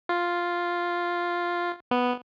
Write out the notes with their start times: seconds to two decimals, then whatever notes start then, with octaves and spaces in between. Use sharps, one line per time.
0.09 F4
1.91 B3